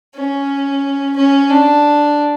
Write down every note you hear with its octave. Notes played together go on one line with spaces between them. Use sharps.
C#4
C#4
D4